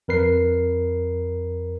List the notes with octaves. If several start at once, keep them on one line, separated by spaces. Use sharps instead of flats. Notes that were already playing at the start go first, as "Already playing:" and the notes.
F2 A#4 B4 C7